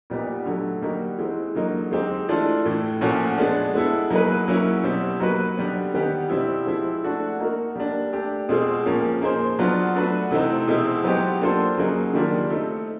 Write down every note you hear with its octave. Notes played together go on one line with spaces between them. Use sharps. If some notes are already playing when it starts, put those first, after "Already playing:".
A#2 G3 B3 D#4
D3 F#3 A3
G3 A#3 D#4 F#4
E3 G#3 C4
D3 F#3 A#3 D#4
G#3 C4 D#4 G4
E3 A3 D4 F4 A4
A2 E3 A3
A#2 F3 A3 C#4 F#4
G#3 B3 D4
G#3 B3 E4 A4
F#3 A#3 D#4 G#4 B4
F#3 A#3 C#4 E4
B2 G3 C4
F#3 A#3 D#4 F#4 B4
D3 G3 B3
D#3 G3 B3 D#4 G4
B2 G3 C4 E4
F3 G#3 C4 E4
A3 D4 F#4 A4
A#3 D#4 F#4 A#4
G3 A#3 D4
A3 D4 G4
B2 G#3 C4 F4 G#4
A#2 F3 A#3 C#4
A#3 D#4 G#4 C5
F#3 B3 D4 F4
A3 D4 F#4 B4
C3 E3 A3 C4 D#4
B2 G#3 C4 E4
F#3 B3 D#4 G4 C5
A#3 D4 F4 A4 C5
C#3 F#3 A#3 D#4 G#4
D#3 G3 A#3 D4 F4
A3 C4 D#4